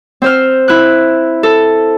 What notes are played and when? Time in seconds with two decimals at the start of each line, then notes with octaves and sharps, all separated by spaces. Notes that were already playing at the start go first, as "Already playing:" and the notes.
0.22 C4 C5 F6
0.68 E4 F#6
1.43 A4